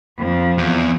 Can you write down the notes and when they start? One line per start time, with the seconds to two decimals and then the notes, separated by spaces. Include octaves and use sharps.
0.17 F2 F3
0.58 E2